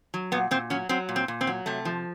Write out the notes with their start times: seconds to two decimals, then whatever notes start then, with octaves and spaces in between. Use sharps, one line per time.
0.14 F#3
0.32 A#2 B3
0.51 A#2 C4
0.70 F#3 C#4
0.89 F#3 C4
1.09 A#2
1.16 C4
1.28 A#2
1.41 C4
1.47 F#3
1.66 C3 A3
1.85 F3